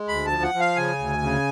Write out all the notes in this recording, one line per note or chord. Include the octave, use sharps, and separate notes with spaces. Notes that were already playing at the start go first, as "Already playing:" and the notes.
Already playing: G#3
D2 B5
A5
F3
F#5
F3
F5
C#3 G#5
D2
C#3